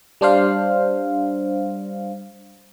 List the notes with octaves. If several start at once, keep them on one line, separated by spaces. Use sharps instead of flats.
G3 D4 C5 F5